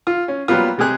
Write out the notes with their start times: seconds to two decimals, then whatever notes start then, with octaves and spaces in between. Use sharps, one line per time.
0.07 F4
0.28 C#4
0.48 F#3 G3 A#3 B3 F4
0.78 C3 G#3 G4 G#4 F#6